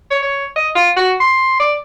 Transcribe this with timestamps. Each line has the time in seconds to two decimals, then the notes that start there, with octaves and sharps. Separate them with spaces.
0.11 C#5
0.23 C#5
0.56 D#5
0.75 F4
0.96 F#4
1.20 C6
1.60 D5